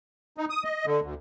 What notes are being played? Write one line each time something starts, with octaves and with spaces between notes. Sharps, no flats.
D#4
D#6
D#5
D3
D2